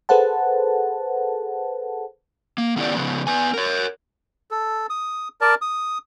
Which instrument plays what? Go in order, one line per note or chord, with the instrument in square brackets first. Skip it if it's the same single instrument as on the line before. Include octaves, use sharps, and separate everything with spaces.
[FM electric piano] G#4 A4 B4 C5 F#5 A5
[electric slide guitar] A#3
D#3 B3 C#4 E4 G4 D5
C#3 F3 B3
B3 B4 G#5
A#4 C#5
[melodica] A4
D#6
A#4 D5 A5
D#6